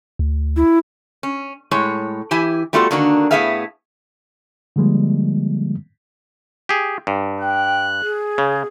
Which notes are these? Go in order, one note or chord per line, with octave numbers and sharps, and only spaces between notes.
D2
E4
C#4
A2 G#3 C#5
E3 E4 G4 G#5
G3 A3 B3 F4 F#4 A4
D3 D#3 A#3 D4 F#4
A2 A#3 B3 G#4 E5 F5
D3 F3 G3 G#3 A#3
G4 G#4
G2
G5 F#6
G#4
C#3